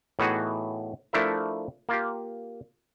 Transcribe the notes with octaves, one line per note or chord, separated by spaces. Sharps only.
A2 E3 B3 D#4 F#4 G#4
F3 A3 D4 E4 A#4 E5
A#3 F4 G4